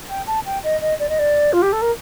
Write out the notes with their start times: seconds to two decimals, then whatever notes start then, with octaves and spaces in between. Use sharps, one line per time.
0.09 G5
0.27 A5
0.45 G5
0.64 D#5
0.81 D#5
0.99 D5
1.09 D#5
1.19 D5
1.53 F4
1.62 G4
1.72 A4
1.81 A#4